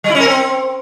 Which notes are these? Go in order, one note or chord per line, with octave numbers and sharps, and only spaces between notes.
G3
E4
C#4
A#4
C4